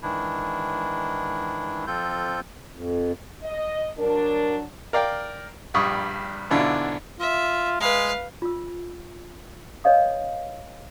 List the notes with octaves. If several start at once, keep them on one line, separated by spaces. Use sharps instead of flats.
G#2 D#3 E3 D4 E4
F2 F3 C4 F4 A4 G6
F2
D#5
F#3 D4 A#4
A#4 D5 F5 G5
A#1 G2 G3 C#6 D#6
G#2 B2 D3 D4 E4 F4
F4 E5
G#3 B4 F5
F4 E6
B4 C#5 D#5 F5 D#6